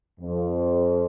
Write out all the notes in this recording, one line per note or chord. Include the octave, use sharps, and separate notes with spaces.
F2